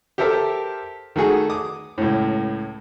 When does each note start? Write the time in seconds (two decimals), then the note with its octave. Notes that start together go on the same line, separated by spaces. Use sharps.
0.18 G4 A4 A#4 C5 E5
1.16 D#3 A3 F#4 G#4
1.50 D6 D#6
1.98 C#2 A2